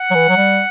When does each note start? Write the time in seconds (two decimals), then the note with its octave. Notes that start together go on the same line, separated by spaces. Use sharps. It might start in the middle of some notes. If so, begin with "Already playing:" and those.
Already playing: F#5
0.10 F#3
0.15 E3
0.29 F#3
0.37 G3